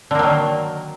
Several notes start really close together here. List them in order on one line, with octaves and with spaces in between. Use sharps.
D3 A#3 F#3 D#3